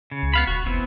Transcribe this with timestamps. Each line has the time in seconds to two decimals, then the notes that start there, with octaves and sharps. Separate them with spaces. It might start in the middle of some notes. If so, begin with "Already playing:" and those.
0.11 C#3
0.23 C#2
0.34 B3 F5 B5
0.47 D#1 F#4
0.66 F1 E3 B3 C4